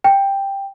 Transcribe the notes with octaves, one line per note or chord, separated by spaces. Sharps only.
G5